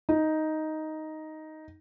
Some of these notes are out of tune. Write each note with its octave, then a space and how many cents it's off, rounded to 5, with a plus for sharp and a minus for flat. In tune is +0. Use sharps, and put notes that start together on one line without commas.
D#4 +5